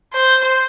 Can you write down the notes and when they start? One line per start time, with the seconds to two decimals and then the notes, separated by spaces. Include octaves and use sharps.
0.13 C5